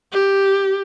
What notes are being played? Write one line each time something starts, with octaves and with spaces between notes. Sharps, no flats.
G4